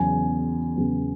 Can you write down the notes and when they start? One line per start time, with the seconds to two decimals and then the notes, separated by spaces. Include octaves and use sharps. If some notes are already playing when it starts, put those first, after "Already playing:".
Already playing: E2 C#3 F#3 B3 G#5
0.76 E2 C#3 F#3 B3